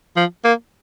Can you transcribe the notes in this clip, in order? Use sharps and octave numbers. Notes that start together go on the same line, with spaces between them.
F3
A#3